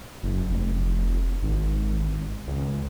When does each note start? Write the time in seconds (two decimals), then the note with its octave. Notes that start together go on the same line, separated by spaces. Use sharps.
0.23 F#1
0.50 F1
1.42 G#1
2.48 C#2